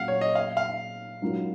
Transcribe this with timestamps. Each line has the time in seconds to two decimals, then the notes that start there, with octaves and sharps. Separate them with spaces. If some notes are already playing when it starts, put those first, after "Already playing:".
Already playing: A#2 F#3 C#4 F5 F#5
0.08 C#5
0.21 D#5
0.35 F5
0.57 F5
1.22 G#2 F#3 C#4 F4 A#4